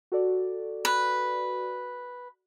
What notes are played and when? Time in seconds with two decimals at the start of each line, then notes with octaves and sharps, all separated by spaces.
0.12 F#4 A4 D5
0.85 B4